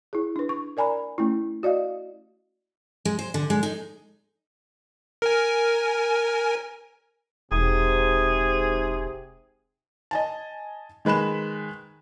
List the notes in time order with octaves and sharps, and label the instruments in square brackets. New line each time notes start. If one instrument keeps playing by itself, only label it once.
[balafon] E4 G#4
D4 B4
C#6
A#4 D5 G#5 A#5 B5
A3 C#4 E4
F#4 D5 D#5 F5
[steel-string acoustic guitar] G#3
C5
D3
G#3
D#4
[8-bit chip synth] A#4 G#5
[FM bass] E1 [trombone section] G#2 C3 [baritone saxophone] G#4
[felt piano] D#5 G#5 A5
D#3 G#3 B4 B5 E7